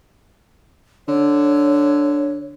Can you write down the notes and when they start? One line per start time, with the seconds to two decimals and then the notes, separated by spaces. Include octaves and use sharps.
1.08 D3 C#5